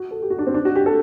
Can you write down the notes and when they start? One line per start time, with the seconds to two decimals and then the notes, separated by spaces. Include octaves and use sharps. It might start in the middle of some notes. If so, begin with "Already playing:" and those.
Already playing: F#4
0.11 A4
0.22 G4
0.30 F#4
0.39 D4
0.47 C4
0.54 D4
0.65 F#4
0.76 G4
0.86 A4